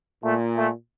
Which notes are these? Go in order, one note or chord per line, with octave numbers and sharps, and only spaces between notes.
A#2 A3
A3